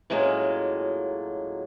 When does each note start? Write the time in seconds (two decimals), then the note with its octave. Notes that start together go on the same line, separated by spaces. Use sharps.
0.10 F#2 A2 F#3 G#3 A#3 F4